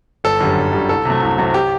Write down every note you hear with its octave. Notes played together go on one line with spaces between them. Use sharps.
G1 A4
F#2 D3 G3
G1
F#2 D3 G3
C2 A4
C3 F#3 A3
C2
C3 F#3 A3
G4